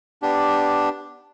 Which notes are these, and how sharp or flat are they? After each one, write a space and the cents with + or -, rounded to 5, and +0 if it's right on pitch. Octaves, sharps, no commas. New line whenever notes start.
B3 +10 D4 +0 G4 +0